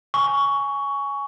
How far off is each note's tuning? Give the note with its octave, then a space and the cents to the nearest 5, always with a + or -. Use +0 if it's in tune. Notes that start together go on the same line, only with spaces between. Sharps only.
G#5 +0 C#6 +15